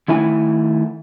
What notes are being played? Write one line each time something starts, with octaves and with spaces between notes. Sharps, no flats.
D#3 A3 E4 E5 F#5 G#5